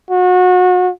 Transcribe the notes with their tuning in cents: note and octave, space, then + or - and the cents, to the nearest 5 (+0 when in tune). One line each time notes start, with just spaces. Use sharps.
F#4 -30